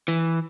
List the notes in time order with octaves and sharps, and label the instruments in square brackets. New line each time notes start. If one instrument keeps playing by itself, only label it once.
[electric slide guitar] E3